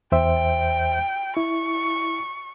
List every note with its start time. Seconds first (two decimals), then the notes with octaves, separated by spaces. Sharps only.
0.12 E2 C5 E5 G5
1.37 E4 C#6